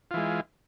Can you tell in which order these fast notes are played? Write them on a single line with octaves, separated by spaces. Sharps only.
F4 E3 G#3